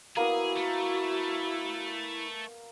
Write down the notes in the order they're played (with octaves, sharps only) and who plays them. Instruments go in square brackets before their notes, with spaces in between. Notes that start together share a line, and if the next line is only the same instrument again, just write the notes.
[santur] A#3 B3 A#4 [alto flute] E4 [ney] F#4 [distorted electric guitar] G#4
[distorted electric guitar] A3